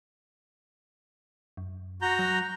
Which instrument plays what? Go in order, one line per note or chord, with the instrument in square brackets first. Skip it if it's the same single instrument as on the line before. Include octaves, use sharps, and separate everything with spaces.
[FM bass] F#2
[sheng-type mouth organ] F#4 A#5 G6
[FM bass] F#3